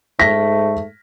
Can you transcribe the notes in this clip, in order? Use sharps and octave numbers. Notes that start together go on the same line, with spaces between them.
G#2 A3 A#6 B6